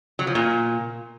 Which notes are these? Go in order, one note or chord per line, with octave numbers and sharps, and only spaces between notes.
F#3
F3
A#2